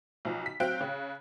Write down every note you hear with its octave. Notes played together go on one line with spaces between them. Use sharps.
B1 F3
B6
F#3 C4 F5 G5 F#6 D7
C#3